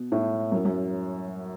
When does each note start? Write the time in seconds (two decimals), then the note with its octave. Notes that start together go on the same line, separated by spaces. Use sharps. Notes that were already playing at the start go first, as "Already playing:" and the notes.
Already playing: B2
0.12 A2
0.52 F#2
0.65 F#2